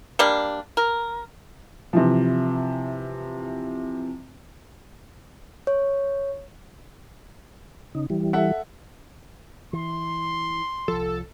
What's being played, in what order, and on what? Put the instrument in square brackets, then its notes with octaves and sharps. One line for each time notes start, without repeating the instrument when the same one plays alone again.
[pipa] G3 A#3 D4
A#4
[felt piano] C3 E3 F3
[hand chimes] C#5
[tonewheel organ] C#3 D#4
E3 G3
[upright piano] A4 E5 F#5
[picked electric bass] E3 [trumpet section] C6
[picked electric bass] C2 F3 [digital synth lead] A4